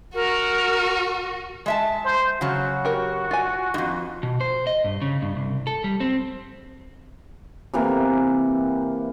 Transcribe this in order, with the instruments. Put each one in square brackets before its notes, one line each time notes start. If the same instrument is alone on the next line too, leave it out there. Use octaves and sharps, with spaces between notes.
[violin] F#4 [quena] A#4
[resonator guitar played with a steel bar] G#3 E5 A5
[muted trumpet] C5
[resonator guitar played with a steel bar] C#3 F#3 [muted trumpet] F#4
[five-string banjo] G4 A#4
F4 G#5
[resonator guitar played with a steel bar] F2 G#2
[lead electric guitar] B2
C5
D#5
G2
C#3
G2
C2
A4
G3
C4
[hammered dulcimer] C3 E3 A#3